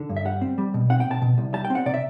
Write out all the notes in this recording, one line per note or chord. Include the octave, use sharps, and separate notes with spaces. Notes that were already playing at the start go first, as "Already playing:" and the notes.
Already playing: D3
G2
E5
G3 F#5
C4
G3
B2
C4 F#5
G5
B2
A5
B2
C2
G3 A5
G5
C4
F#5
C3 D5
E5